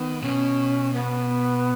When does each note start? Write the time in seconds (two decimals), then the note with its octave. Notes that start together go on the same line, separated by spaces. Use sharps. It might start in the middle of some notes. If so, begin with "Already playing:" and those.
Already playing: D#3 B3
0.22 B2 C#4
0.94 B3